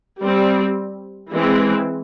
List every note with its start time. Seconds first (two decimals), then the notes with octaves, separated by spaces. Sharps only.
0.22 G3 C4
1.33 E3 G#3 C4